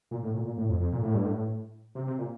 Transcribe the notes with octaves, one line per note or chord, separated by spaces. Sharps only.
A#2
A2
A#2
A#2
A2
F2
F2
A#2
A2
G2
A2
C3
C3
A#2